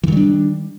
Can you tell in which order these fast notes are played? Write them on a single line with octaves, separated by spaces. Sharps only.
E3 D#3 G3 D4